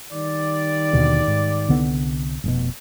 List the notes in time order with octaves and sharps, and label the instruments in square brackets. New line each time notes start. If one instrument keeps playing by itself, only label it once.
[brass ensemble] D#3 G3 D5
[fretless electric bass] D#2 B2 D3
G#2
C2 D3 B3
F1 G#2 B2